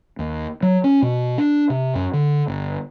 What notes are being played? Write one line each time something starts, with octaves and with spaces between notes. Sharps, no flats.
D#2
F#3
C#4
B2
D4
C3
F#2
D3
G1